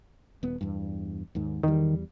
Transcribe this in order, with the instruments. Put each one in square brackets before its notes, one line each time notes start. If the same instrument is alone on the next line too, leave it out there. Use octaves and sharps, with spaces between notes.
[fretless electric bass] D#1 B3
E2 G2
D#2 G#2 D#3
[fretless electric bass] E2 G3 [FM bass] D#3